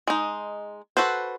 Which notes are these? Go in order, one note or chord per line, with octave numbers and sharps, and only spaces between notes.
G#3 D#4
F#4 A4 B4 C5